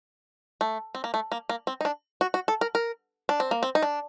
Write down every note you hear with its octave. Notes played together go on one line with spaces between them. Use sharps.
A3
C4
A#3
A3
A#3
A#3
C4
D#4
D4
F#4
F#4
A4
A#4
A#4
D4
C4
A#3
C4
D#4
D4